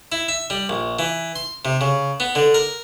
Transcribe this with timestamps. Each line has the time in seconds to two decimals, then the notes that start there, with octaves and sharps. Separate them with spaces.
0.12 E4
0.28 E5
0.50 G3
0.69 A#1
0.99 E3
1.36 C6
1.65 C3
1.81 C#3
2.20 B3
2.35 D3
2.54 A#4